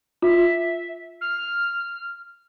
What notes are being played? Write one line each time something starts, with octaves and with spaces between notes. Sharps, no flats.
F4 E5
F6